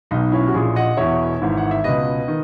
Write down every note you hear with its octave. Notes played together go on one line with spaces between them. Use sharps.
B1 B2 D#4
C#4 E4
F#4
A#1 A#2 E4 G#4
D#5 F#5
E1 E2 B2 C#5 E5
G#1 G#2 E3
F#5
E5
C#2 B2 B4 D#5
D#3